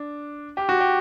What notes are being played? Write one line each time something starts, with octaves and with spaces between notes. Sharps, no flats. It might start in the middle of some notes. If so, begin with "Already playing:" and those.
Already playing: D4
G4
F#4
G4